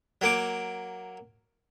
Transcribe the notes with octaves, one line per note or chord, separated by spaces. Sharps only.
F#3 A#3 D6